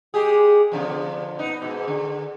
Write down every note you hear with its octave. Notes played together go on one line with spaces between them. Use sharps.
G#3 G4 G#4
B2 D3 F3
B3 D#4
G#2 B2
D3